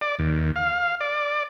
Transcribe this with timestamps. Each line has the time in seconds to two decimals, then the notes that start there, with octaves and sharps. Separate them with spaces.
0.01 D5
0.19 D#2
0.56 F5
1.01 D5